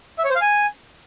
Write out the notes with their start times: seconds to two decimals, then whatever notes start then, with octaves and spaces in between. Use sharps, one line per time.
0.19 E5
0.24 C#5
0.30 C5
0.36 F5
0.41 G#5